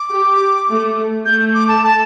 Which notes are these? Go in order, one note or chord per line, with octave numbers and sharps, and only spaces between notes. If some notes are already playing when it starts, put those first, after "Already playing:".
Already playing: D6
G4
A3
A3 G6
D6
A5
A5